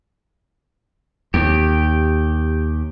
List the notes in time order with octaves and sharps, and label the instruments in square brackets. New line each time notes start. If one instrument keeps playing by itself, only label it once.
[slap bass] D#2 [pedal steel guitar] G4